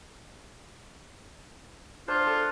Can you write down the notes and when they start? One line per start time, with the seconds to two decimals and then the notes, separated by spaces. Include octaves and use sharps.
2.08 D4 F4 C5
2.27 A4